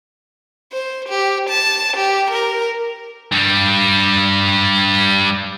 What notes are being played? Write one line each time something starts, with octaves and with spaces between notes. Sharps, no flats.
C5
G4
A5
G4
A#4
G2 G3